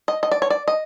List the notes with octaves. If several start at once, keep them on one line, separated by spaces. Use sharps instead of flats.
D#5
D#5
D5
C#5
D5
D#5